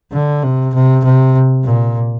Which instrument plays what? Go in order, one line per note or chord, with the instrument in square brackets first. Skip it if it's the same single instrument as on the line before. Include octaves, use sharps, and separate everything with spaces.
[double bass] D3
C3
C3
C3
A#2